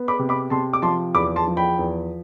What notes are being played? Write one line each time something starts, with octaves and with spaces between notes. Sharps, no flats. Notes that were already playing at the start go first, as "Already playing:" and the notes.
Already playing: B3
B5 D6
C3
B5 D6
C3 A5 C6
D6
F3 A5 C6
E2 B5 D6
A5 C6
F3
G5 B5
E2